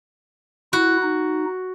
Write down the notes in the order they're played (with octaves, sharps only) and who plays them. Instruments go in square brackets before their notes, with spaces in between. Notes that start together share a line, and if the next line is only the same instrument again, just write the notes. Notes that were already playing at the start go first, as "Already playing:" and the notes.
[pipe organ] E4 [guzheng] F#4
[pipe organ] D#4